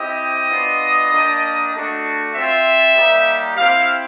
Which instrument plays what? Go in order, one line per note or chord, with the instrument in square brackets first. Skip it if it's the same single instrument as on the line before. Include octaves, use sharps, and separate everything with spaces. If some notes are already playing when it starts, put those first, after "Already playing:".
Already playing: [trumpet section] C4 E4 G4 D#5
B3 D4 F4
A#3 D4 G4
A3 D4 F#4
C4 F4 E5
G3 A#3 D#4 G4
C4 E4 G4 F5